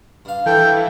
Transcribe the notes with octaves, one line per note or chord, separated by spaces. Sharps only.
G2 F5
E3 A4 G5